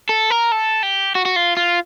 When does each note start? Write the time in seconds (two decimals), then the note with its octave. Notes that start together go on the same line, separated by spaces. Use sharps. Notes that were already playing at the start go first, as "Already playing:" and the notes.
0.09 A4
0.30 A#4
0.52 A4
0.83 G4
1.15 F#4
1.25 F#4
1.36 F4
1.57 F4